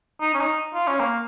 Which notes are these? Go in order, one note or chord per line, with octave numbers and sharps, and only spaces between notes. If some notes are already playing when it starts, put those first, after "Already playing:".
D#4
C#4
D#4
F4
C#4
A#3